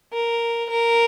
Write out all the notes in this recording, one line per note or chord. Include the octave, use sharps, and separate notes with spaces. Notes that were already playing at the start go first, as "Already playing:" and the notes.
A#4
A#4